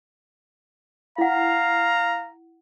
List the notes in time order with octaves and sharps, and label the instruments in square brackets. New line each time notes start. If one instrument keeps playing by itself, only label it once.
[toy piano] E4 F#5 [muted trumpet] F5 [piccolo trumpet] A#5